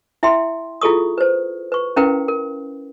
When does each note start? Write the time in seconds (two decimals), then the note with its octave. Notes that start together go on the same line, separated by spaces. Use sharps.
0.23 E4 E5 G5 C6
0.81 E4 F4 G#4 A4 C#6 D#6
1.18 B4 C5
1.72 B4 C#6
1.96 C#4 E4 A#4 B4 F5 G5
2.28 A#4